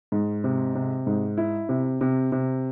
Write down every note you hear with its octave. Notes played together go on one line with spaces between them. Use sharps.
G#2
C3
C3
G#2
E4
C3
C3
C3